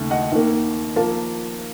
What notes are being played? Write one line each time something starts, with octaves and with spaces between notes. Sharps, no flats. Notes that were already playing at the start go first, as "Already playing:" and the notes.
Already playing: D#2 C#3 A3
D#5 F#5
D#2 D#3 A#3
F3 A#3 F5 A5